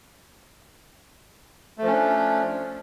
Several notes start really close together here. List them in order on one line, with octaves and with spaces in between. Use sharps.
A3 F3 C#4 D4